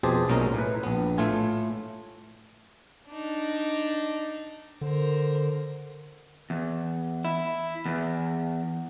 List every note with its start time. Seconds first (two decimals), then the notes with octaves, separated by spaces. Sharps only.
0.03 F2 B2 G4 G#4 C5 A5
0.28 B1 A#2 G#3 C#4 A#4
0.54 A2 B4
0.83 A#1 B3
1.18 A2 A3 E4 F4 G#5
3.09 D4 D#4
4.81 D3 A#4 C5
6.50 E2
7.25 E4
7.86 E2